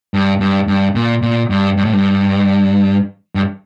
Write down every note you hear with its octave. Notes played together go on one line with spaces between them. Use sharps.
G2
G2
G2
A#2
A#2
G2
G2
A2
G2
G2